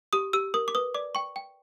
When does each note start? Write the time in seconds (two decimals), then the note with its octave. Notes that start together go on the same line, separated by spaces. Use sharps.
0.13 G4 D#6
0.33 G4 E6
0.54 A#4 D#6
0.68 D6
0.75 B4 D#6
0.94 D5 D6
1.15 G5 C#6
1.36 G5